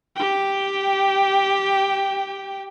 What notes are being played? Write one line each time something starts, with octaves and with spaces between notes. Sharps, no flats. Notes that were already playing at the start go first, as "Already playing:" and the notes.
G4 G5